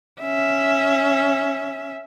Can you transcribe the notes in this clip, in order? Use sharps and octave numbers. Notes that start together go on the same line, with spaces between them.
C#4 E5